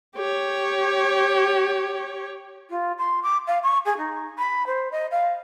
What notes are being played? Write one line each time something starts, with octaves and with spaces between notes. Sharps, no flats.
G4 C#5
F4
C6
D6
F5
C#6
G#4
D#4
B5
C5
D#5
F5